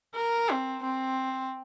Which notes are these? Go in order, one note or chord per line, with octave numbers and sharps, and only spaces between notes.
A#4
C4
C4